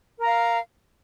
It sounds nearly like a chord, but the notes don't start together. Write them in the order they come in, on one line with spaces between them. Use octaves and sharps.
A#4 A#5 F5